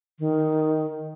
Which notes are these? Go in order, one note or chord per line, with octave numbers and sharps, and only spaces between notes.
D#3